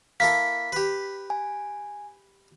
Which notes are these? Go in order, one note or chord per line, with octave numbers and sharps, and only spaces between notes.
A#3 E4 A4 B6
G4 B4
G#5